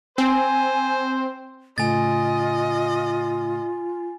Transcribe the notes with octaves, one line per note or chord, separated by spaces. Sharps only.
C4 C5 G#5
A2 C#3 A3 F4 D#5 G#5 A6